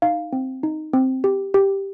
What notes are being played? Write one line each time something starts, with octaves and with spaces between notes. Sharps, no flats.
D#4 F5
C4
D#4
C4
G4
G4